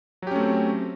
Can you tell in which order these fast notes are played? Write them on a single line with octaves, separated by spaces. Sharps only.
F#3 G4 C#4 A3 C4